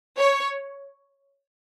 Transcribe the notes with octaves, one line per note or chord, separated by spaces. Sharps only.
C#5